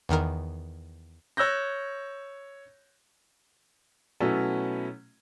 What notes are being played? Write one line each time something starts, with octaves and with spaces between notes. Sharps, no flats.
E2 D#3 A#4
C#5 E6 F#6 G6 A#6
B2 F#3 A3 B3 C#4 E4